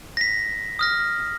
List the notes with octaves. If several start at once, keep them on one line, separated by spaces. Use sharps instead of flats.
A#6 B6
D#6 F6 A#6